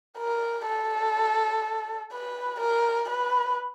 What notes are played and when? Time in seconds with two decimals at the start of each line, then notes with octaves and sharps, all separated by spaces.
0.18 A#4
0.67 A4
2.12 B4
2.60 A#4
3.10 B4